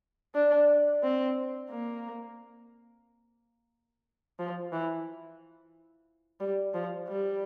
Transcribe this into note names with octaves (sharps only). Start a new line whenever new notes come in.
D4
C4
A#3
F3
E3
G3
F3
G3